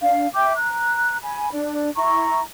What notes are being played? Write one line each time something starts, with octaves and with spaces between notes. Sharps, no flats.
D4 F5
E5 G5 D6 G6
A#5 F#6
G#5 B5
D4
E4 A#5 C#6